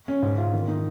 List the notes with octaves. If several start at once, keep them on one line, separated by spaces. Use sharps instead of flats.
C#4
G#2
F4
D#3
D#4